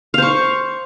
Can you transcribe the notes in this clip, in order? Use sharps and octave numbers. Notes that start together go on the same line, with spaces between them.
C5 F5 C#6